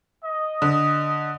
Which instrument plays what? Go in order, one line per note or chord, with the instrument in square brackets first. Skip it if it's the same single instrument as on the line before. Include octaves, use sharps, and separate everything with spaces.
[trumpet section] D#5
[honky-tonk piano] D3